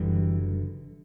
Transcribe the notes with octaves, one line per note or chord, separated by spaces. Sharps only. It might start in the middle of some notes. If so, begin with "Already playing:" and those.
Already playing: F#1 F#2 D3 E3 G3